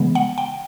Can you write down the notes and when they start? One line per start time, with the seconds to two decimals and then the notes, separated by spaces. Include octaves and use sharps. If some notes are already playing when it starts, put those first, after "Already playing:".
Already playing: C#3 E3 G#3 B3
0.15 F#5
0.38 G5